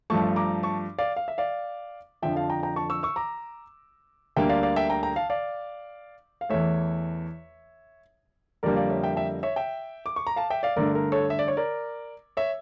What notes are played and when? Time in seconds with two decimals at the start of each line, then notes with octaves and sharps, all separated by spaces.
0.10 G2 F3 A3 A5 C#6
0.36 A#5 D6
0.63 A5 C#6
0.99 D5 F5
1.16 F5
1.28 E5
1.38 D5 F5
2.22 F2 D3 F3 E5 G5
2.36 F5 A5
2.50 G5 A#5
2.63 G5 A#5
2.76 A5 C#6
2.90 C#6 E6
3.03 C#6 E6
3.16 A#5 D6
4.37 D2 D3 G3 A#3 E5 G5
4.49 D5 F5
4.63 D5 F5
4.76 E5 G5
4.89 G5 A#5
5.03 G5 A#5
5.16 F5 A5
5.30 D5 F5
6.41 F5
6.49 E2 E3 A3 C#5 E5
8.63 F2 D3 G3 A#3 A#4 D5
8.76 D5 F5
8.90 C#5 E5
9.03 E5 G5
9.16 E5 G5
9.43 C#5 E5
9.56 E5 G5
10.06 D6
10.16 C#6
10.27 A#5
10.36 F5 A5
10.50 E5 G5
10.63 D5 F5
10.76 G2 D3 A3 A#4 D5
10.95 A#4
11.12 A4 C#5
11.30 E5
11.39 D5
11.48 C#5
11.57 A#4 D5
12.37 C#5 E5